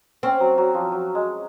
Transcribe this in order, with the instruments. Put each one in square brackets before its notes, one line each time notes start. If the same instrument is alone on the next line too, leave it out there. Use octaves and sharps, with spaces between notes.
[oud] C4 [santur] C#4
[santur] F#3
F#3
F3
F#3
G#3